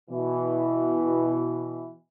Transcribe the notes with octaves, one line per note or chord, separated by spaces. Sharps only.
B2 E3